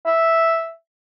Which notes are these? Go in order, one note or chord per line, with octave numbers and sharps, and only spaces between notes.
E5